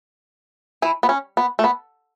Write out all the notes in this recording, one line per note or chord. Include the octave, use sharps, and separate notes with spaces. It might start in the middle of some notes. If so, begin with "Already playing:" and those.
E3 E4
B3
C#4
B3
A3
B3